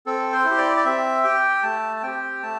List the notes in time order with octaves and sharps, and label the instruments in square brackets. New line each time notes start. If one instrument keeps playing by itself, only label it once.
[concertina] C4 A4
C5
E4
G4
D5
D5
C4 E5
G4 G5
A3 A5
A5
C4 G4 G5
A3 A5